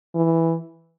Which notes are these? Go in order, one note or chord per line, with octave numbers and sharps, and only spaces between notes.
E3